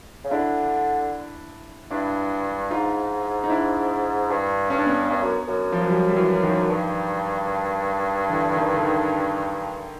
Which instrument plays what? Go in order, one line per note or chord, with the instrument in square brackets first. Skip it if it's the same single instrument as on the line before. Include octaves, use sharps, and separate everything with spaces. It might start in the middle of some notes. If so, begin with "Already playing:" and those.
[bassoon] C#3
[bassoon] D3 [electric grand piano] D4 E4
[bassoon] G2 [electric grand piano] D4 E4
[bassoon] G#2 [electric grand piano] D#4 F4
[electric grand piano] D#4
D4 E4
[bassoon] G2
[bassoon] G2 [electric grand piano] C#4
[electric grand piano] D4
B3 C#4
[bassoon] G2
F#2
F#2
[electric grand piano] F3
F#3
F3 G3
G3
E3 F#3
D#3 F3
[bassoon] G2
[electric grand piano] D3 E3
D#3
D3
D#3